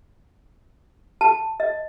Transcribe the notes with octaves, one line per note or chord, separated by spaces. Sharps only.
A5
D#5